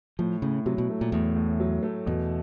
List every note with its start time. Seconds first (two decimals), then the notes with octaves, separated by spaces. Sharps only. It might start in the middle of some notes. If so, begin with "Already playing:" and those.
0.19 A2 F3
0.42 A2 C#3
0.66 C3 F#3
0.78 B2
0.90 A3
1.01 A#2
1.12 E2 A2
1.36 A2
1.60 F#3
1.83 A3
2.06 E2 B2